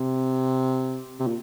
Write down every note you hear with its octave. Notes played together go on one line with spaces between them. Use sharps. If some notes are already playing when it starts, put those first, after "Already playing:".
Already playing: C3
C3
A#2